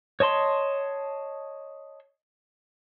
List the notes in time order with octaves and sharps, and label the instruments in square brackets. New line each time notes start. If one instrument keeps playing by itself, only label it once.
[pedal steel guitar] C#5 D#5 A5 C6